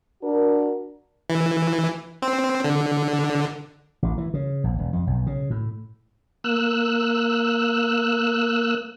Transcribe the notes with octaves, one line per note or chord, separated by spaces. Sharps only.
D4 F#4 A#4
E3
C4
D3
A1
E3
C#3
A#1
E1
F2
B1
C#3
A2
A#3 E6 F#6